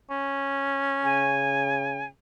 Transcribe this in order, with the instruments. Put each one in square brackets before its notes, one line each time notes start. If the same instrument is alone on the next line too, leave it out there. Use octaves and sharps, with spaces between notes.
[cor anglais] C#4
[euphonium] C#3 [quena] G#5